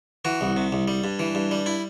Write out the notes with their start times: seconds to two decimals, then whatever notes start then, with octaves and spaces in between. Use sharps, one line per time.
0.25 E3 F#4
0.41 C2
0.57 C3
0.72 C2
0.88 G3
1.04 G2
1.19 E3
1.35 G2
1.51 G3
1.66 E4